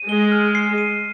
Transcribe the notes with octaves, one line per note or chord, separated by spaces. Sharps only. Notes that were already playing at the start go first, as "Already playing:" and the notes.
Already playing: D#7
G#3 G7
F6
C7
D#7